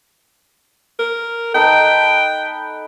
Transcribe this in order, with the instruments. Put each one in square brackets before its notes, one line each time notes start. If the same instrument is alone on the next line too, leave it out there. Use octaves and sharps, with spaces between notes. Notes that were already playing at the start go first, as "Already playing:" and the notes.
[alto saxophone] A#4
[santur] D#4 A4 B4 [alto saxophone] G5